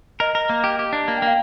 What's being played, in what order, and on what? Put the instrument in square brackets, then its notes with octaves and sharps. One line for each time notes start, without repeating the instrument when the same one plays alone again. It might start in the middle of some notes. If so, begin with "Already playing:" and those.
[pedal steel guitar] A#4 [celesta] D#5
[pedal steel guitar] A#4
A#3
G4
G4
D4
A#3
[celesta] G5
[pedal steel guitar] A#3
[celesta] F5